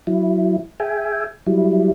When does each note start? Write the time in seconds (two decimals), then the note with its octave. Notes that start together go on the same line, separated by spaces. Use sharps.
0.07 F#3 E4
0.80 G#4 E5 G5 G#5
1.47 F#3 G3 E4